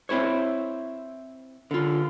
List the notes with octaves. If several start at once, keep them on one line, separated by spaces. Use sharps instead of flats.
C4 E4 C5 C#5
D3 F4